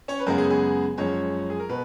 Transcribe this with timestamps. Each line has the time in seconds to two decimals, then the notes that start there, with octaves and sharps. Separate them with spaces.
0.08 C#4 C#5
0.19 B4
0.27 F#2 C#3 G#3 B3 A#4
0.38 G#4
0.50 G#4
0.98 F#2 F3 G#3 C#4 C#5
1.50 G#4
1.60 A#4
1.69 B2 B4